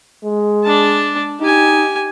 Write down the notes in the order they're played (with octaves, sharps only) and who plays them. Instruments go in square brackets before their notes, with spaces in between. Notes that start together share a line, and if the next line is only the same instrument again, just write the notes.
[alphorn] G#3
[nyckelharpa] D4 A5
[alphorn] D#4 [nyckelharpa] G4 G#5